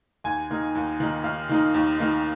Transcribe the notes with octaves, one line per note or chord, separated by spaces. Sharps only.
D#2 G#5
D#3 A#3 D#4
D#2
D#3 A#3 D#4
D#2 F5
D#3 A#3 D#4
D#2
D#3 A#3 D#4